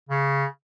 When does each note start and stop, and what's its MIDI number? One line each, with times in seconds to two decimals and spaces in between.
0.09 0.44 49